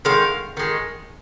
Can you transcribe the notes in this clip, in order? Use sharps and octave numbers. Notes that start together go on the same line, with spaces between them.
D#3 G#3 F5
D#3 G#3